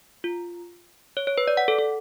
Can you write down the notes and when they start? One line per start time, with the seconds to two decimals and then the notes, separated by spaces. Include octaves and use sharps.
0.24 F4
1.17 C#5
1.27 C#5
1.38 B4
1.48 D5
1.57 F#5
1.68 A4
1.78 A4